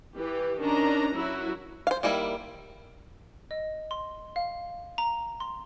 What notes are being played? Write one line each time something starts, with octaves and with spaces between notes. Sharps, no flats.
E3 G4
D#3 C#4 D4 A#5
F#3 E4 F#4
C5 F5
D#3 G3 A#3 E4
D#5
C6
F5
A#5
C6